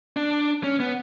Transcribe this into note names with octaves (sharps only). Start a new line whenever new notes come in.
D4
C#4
B3